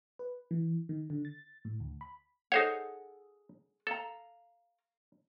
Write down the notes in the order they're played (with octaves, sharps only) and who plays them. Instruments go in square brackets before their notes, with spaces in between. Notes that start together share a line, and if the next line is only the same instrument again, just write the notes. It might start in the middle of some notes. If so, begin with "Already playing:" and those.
[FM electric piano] B4
E3
D#3
D3
A6
A2
D2
B5
[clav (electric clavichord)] D#4 C5 C#5 [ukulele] G#4 A4 F#5
[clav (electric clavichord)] A4 [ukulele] F5 A#5